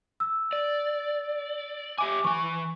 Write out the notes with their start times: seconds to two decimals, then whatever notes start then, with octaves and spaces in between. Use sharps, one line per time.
0.20 E6
0.53 D5
1.98 G4 E5 G#5 D6
2.24 E3 G#5 C#6